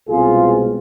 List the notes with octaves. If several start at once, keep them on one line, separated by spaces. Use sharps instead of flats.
C2 B2 G#3 C4 F4 G#4